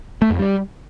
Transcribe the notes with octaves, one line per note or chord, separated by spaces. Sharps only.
A3
F2
G3